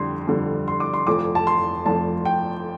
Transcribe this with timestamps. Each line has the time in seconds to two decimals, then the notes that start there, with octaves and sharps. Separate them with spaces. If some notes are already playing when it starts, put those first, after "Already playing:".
Already playing: F2 D3 G3 C6
0.28 F2 D3 G3
0.68 C6
0.80 D6
0.93 C6
1.07 F1 F2 F3 D6
1.35 A5
1.47 C6
1.85 F1 F2 F3 A5
2.25 G5